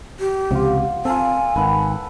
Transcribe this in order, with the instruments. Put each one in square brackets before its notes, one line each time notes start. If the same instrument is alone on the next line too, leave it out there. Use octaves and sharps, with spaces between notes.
[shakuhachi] G4
[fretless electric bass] C#2 C3 F3 [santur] F4 F#5
[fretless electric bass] C4 [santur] F4 A4 [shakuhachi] G#5
[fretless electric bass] G#1 D#3 [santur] B4 F#5